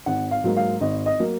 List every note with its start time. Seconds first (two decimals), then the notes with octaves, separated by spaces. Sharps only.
0.06 G#1 F#5
0.31 F5
0.44 G#2 F#3 A#3
0.57 F5
0.80 G#1 D#5
1.06 D#5
1.20 F#3 A#3